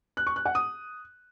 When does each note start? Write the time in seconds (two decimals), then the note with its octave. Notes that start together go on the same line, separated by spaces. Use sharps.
0.17 F#6
0.26 C#6
0.36 F#6
0.45 F#5
0.55 D#6